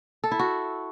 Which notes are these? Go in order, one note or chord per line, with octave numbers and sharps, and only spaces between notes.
A4
E4
F#4